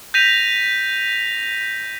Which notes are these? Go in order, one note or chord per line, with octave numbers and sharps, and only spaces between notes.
G6 A#6 B6 D#7 F7